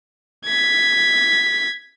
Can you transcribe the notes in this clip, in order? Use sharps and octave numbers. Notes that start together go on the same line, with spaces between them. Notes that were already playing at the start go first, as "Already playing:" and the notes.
G#6 B6